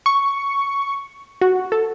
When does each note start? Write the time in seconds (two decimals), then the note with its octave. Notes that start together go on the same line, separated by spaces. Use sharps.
0.06 C#6
1.41 F#4
1.72 A4